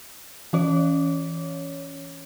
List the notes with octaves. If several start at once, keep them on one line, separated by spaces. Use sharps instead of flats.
E3 C#4 C#5